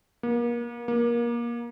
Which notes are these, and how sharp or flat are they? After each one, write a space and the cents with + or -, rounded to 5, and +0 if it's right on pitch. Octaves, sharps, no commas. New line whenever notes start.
A#3 +35
A#3 +25